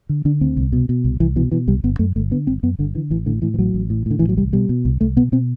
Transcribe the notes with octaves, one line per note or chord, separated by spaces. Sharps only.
D3
D3 D4
D2 C4
C2
B2
B2
C2
C2 E3
B2 E3
B2 E3
C2 G3
G1 B3
F#2 A3
G1 A3
D3 B3
G1 C4
F#2 B3
G1 D3
D3 E3
A1 E3
A2 D3
A2 E3
E3
A1 F#3
A1
A2
A2 D3
A1 E3
F#3
C2 G3
B2 G3
B2
C2
C2 A3
B2 B3
B2 C4